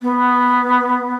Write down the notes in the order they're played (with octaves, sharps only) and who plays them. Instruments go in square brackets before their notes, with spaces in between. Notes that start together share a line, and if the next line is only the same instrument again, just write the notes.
[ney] B3